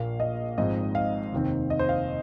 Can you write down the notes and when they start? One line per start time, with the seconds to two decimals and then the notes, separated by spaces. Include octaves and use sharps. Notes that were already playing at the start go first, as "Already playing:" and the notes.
Already playing: A#1 A#2 A#3 F5
0.20 D#5
0.58 G#1 G#2 F3 C4 D#5
0.95 F5
1.33 F1 D#2 D#3 C4
1.70 D#5
1.79 C5
1.89 F5